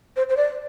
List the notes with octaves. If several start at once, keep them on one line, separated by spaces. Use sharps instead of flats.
C5
C5
D5